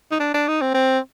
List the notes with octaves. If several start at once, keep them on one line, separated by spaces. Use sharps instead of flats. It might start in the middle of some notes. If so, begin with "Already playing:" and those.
D#4
D4
D4
D#4
C4
C4